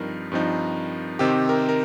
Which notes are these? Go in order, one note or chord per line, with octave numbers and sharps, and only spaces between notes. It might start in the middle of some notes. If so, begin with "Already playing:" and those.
Already playing: G2 F3 C4 D#4 A#4
G2 F3 C4 D#4
C3 D#3 C4 D#4 G4
A#4
A#4